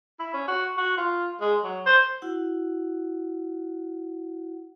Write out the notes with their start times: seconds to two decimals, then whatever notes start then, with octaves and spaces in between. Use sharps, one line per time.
0.19 E4
0.34 C#4
0.48 F#4
0.77 F#4
0.97 F4
1.41 G#3
1.64 F#3
1.86 C5
2.22 E4 F#4 F#5